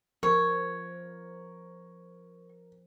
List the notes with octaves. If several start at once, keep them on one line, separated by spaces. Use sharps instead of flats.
F3 A#4 C#5